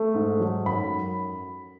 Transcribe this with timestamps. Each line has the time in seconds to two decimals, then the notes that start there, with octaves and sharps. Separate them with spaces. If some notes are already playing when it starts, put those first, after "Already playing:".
Already playing: A3
0.14 G#2
0.40 F#3
0.66 F#2 B5